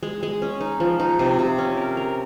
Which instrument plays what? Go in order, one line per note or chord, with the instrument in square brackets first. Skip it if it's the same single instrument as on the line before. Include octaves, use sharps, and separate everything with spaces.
[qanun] G#3
G#3
C#4
D#4
F3
D#4
C3
C3
C#4
A#4
A#4